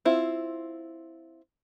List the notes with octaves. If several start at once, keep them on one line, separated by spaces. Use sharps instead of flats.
C4 E4 F4